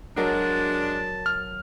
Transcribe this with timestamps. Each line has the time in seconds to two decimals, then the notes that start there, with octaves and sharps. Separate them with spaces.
0.17 F#3 G#3 D4 F#4 A#4 A5
1.26 F6